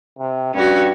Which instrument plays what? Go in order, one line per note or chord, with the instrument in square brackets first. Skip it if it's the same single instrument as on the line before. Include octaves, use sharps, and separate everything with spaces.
[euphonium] C3
[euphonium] G2 [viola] C#4 F#4